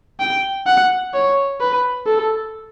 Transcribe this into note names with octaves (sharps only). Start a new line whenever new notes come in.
G5
F#5
C#5
B4
A4